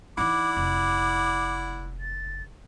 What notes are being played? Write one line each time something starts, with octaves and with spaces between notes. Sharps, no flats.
E3 D#4 E4 D5 F#5 D6
F1 D6
A6